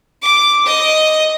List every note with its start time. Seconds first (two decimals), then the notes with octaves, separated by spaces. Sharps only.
0.22 D6
0.65 D#5